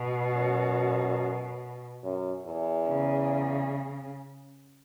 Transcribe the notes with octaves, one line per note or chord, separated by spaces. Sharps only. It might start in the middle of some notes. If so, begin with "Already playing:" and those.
Already playing: B2
F#2
F#2
E2
C#3